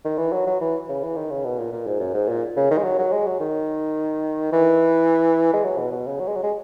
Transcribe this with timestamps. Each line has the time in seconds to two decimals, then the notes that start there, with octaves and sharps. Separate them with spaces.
0.05 D#3
0.18 E3
0.33 F#3
0.47 F#3
0.61 E3
0.89 C#3
1.03 E3
1.16 D#3
1.31 C#3
1.44 B2
1.58 A#2
1.72 A#2
1.87 G#2
2.00 F#2
2.14 G#2
2.28 A#2
2.57 C#3
2.71 D#3
2.78 G#3
2.84 F#3
2.99 F#3
3.12 G#3
3.27 F#3
3.40 D#3
4.52 E3
5.54 G#3
5.64 F#3
5.78 B2
5.92 B2
6.06 C#3
6.20 F#3
6.28 G#3
6.36 F#3
6.43 G#3